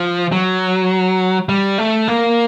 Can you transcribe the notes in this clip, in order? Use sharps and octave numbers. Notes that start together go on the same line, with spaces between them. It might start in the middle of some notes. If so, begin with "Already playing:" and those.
Already playing: F3
F#3
G3
A3
A#3